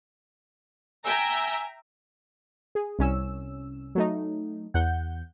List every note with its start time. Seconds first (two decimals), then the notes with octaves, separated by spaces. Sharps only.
1.05 E5 G5 G#5 A#5
2.75 G#4
2.99 C2 C#4 E6
3.95 F#3 A3 D#4
4.74 E2 F#5 G6